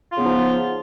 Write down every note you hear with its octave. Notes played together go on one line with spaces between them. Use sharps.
C#3 F3 B3 D#4 F4